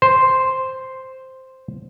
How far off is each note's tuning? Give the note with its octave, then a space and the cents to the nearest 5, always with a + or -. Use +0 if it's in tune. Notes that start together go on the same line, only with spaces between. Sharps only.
C5 +0